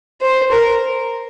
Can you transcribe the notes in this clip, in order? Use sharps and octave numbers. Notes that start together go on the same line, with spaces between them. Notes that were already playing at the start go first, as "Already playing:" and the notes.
C5
A#4